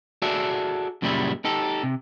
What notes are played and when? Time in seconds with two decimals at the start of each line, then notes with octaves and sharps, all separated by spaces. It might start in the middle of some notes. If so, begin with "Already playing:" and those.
0.22 F#4 G#4 A4 D5 E5
1.02 F#2 A#2 C#3 G3 E4
1.45 D#4 G4 A4
1.83 C3